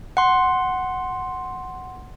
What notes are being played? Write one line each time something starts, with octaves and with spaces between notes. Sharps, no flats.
F#5 C6